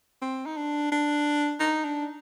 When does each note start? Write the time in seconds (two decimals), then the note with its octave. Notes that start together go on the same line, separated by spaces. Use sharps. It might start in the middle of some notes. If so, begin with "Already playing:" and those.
0.22 C4
0.46 D#4
0.57 D4
0.92 D4
1.60 D#4
1.84 D4